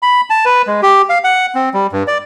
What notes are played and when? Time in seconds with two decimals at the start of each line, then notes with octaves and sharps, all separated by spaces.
0.03 B5
0.30 A5
0.45 B4
0.67 G#3
0.83 G4
1.09 F5
1.24 F#5
1.55 C4
1.74 G3
1.92 G2
2.08 D5